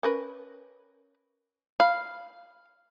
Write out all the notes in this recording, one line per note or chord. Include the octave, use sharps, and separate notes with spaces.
C#4 A#4 B4
F5 B5